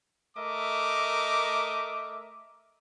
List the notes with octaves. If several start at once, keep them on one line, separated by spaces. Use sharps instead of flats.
A3 A#4 D#5 E5 D6